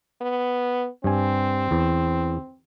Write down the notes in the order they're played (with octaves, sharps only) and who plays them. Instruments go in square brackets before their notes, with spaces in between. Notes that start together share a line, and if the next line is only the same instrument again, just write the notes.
[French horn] B3
[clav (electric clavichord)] G2 G#5 [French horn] C4
[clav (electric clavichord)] E2